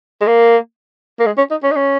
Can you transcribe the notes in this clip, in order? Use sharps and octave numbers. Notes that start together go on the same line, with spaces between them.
G#3
A#3
A#3
G#3
C#4
D#4
C#4
D#4
C#4